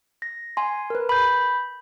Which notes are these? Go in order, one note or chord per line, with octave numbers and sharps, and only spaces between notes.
A#6
G#5 C6
A#4 B4
B5 G6